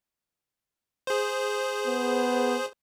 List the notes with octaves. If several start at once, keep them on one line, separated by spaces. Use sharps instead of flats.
G#4 C5
B3